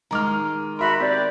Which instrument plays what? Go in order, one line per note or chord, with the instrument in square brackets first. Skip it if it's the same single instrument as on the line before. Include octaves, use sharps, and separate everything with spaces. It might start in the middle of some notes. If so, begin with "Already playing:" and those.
[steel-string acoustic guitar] D#3 G#3 [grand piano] A#5 D6 F6
[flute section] F#4 B5 C6 [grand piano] A#4 E5
[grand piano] C4 [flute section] G4 D5